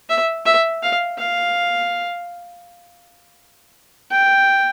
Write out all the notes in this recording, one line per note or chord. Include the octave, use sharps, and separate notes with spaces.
E5
E5
F5
F5
G5